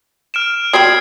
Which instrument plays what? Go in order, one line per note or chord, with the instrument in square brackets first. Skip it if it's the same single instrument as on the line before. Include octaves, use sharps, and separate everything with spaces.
[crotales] F6 D7 E7
[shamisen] F#3 G3 C4 [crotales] D#6 G#6 C7